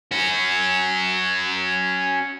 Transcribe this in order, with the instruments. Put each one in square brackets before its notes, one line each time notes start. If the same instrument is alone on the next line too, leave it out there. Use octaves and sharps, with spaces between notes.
[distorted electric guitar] C#4 F#4